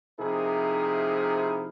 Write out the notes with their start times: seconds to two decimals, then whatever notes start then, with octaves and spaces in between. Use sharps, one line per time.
0.19 C3 F3 D#4 E4 G#4 A#4